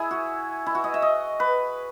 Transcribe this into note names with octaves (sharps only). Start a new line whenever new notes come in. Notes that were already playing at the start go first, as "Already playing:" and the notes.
Already playing: E4 G#4 E5
F#4
E4
F#4
D#5
E5
D#5
B4